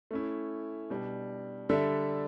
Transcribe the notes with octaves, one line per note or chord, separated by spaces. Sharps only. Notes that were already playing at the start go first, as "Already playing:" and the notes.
A3 C#4 E4
B2 G3 D4
D3 G3 D4 A4 E5